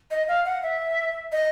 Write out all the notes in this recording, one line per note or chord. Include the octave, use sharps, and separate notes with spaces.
D#5
F5
F#5
E5
D#5